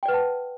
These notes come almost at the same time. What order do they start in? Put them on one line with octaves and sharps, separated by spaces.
G5 D5 B4 F#5 A5